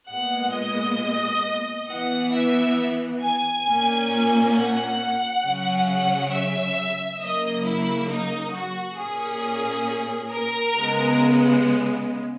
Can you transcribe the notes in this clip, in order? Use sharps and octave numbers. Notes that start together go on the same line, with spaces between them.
A#2 G#3 B3 F#5
D#5
E3 B3 F#5
E5
G#5
A#2 A#3 C#4
F#5
C#3 F#3 C#4
F#5
E5
C#3 F#3 A#3 D#5
E4
D#4
F#4
A#2 A#3 C#4 G#4
A#4
C#3 G#3 B3